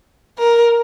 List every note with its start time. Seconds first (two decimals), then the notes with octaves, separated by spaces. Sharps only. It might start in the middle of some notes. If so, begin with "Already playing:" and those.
0.39 A#4